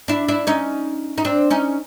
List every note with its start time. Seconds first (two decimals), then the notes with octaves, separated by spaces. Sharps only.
0.08 D4 E4
0.28 D4 E4
0.47 C#4 D#4
1.18 D#4
1.25 C4 D4
1.50 C#4 D#4